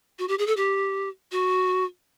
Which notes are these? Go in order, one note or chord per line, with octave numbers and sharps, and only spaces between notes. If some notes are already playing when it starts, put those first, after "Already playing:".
F#4
G4
G#4
A4
G4
F#4